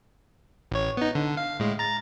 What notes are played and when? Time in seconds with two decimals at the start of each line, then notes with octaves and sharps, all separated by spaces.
0.71 A1 C#5
0.97 B3 D#4
1.15 D3
1.37 F5
1.60 A2 G#3
1.79 A#5 A6